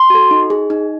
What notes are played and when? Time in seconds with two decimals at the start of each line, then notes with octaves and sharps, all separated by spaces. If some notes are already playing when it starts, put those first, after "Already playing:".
Already playing: C6
0.10 F#4 A4
0.31 D#4
0.50 G#4
0.70 D#4